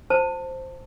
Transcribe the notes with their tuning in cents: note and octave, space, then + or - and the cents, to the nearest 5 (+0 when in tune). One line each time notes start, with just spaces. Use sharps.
F4 +0 C5 +0 A5 +25